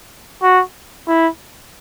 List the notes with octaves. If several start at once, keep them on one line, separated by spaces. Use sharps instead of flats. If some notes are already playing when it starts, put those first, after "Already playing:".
F#4
E4